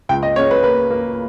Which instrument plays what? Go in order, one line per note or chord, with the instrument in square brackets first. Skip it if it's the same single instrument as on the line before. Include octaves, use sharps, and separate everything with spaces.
[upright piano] C#2 G5
D#5
C#3 C#5
B4
A#3 B4
A#3